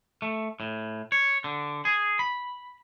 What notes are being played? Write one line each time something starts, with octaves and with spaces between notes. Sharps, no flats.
A3
A2
C#5
D3
G#4
B5